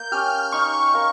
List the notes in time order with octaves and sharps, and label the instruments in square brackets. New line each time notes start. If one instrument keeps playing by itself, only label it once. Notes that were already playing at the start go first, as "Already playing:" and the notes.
Already playing: [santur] A#3 A#4 [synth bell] G6
[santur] C#4 G4 [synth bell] F6
[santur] D#4 [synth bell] C#6
[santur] A#4 F5